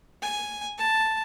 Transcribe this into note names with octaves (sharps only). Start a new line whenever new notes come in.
G#5
A5